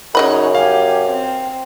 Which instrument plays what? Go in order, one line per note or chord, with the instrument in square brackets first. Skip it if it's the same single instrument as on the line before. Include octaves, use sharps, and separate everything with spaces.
[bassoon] F#2 [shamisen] C#3 D#5 B5 [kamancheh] C#4 D#4
[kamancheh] G4 G#5 [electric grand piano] F5
[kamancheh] C4